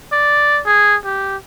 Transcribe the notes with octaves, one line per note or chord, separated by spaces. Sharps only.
D5
G#4
G4